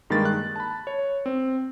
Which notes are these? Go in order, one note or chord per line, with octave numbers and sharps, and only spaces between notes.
G2 D#3 G#3 A#3 A6
F#6
A5 B5
C#5
C4